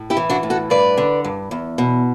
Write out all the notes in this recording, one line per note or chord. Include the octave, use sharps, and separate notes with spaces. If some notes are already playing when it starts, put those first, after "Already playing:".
Already playing: A2
E4 G4
E3
D4 F#4
A2
F#4 A4
G2 B4 D5
D3
G2
E2
B2